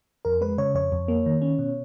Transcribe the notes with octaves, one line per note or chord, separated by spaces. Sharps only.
F2 A#4
G#3 B4
C#3 C#5
F2 C#5
F2
A#3
D#3
C#4
B2